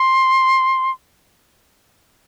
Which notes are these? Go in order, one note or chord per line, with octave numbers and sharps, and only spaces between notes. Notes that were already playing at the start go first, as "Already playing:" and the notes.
Already playing: C6